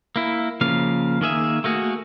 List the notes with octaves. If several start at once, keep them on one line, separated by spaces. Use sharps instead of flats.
A#3 E4
C#3 F3 A#3 F5
D#3 A#3 G#4 E5
A3 A#3 F#4 G#4